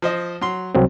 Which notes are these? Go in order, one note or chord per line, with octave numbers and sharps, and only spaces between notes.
F3 C5 D#5
F#3 C6
C2 F#3 C4